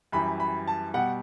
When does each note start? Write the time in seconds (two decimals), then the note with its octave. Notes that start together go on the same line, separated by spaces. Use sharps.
0.12 F#2 E3 G3 B5
0.40 B5
0.68 A5
0.94 B2 G3 F#5